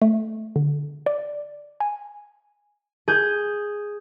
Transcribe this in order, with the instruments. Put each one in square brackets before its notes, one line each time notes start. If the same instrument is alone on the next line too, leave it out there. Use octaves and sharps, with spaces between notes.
[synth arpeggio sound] A3
D3
D5
G#5
[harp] G#4 G6